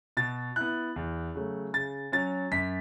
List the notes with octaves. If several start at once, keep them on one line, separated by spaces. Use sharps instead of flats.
B2 A6
B3 E4 F#6
E2
C#3 F#3 A3
C#3 A6
F#3 C#4 A6
F#2 B6